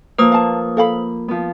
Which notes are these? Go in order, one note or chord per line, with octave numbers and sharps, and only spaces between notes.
F3 A#3 B4 C5 D#6
F5 A5
A4 F5 B5
F3 B3